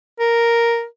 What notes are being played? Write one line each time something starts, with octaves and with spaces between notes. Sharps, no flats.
A#4